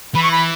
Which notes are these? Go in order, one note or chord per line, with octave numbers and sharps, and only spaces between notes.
E3 B5
C#6
B5